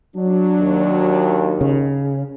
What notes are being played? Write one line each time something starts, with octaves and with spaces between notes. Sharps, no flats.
F#3 D4
D#2
C#3